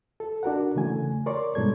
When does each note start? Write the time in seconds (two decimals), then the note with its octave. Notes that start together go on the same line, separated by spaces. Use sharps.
0.20 A4
0.43 D4 F#4 A#4 F#5
0.75 C#3 E3 A3 G#5
1.26 A#4 C#5 D5 C6 C#6
1.55 G#2 B2 G3 A4 G#6